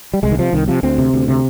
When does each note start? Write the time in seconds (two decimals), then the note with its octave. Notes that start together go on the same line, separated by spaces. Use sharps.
0.14 G3
0.23 C2 G#3
0.31 D#3
0.39 C3 F3
0.53 C2 D#3
0.68 C3 F3
0.83 D2 C4
0.98 C3
1.14 D2
1.28 C3